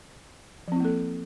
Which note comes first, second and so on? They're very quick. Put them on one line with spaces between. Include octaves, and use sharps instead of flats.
F3 C4 E4 A#3 A4